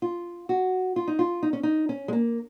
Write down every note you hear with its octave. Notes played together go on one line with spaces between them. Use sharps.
F4
F#4
F4
D#4
F4
D#4
C#4
D#4
C#4
G#3
A#3